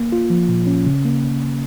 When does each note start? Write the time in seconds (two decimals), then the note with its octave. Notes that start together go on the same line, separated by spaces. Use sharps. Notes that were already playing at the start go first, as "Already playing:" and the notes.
Already playing: A#3
0.12 F4
0.30 F3
0.49 A#2
0.67 C#4
0.86 C#3
1.05 A#3